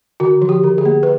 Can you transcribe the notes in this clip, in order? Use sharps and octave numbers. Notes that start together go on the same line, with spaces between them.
D3 F#4
F3
G4
D3
G#4
A#3
B4